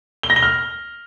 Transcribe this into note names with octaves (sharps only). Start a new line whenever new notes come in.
G7
A#6
G7
F6